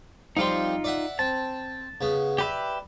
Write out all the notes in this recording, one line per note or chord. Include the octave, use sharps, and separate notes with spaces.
F3 G3 C4 D#4 F4 C6
D5 E5 F#5
C4 A5
C#3 B3
G4 B4 D5 E5